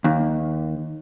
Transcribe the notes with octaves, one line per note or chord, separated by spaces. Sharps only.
D#2